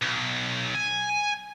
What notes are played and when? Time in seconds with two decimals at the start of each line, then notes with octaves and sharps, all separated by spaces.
0.02 B1
0.75 G#5